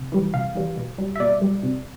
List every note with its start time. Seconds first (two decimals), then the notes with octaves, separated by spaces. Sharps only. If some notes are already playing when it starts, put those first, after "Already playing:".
Already playing: C3
0.12 E3 G3
0.34 C3 F5
0.55 E3 G3
0.77 B2
0.98 G3
1.16 E5
1.20 B2 D5
1.41 G3
1.63 C3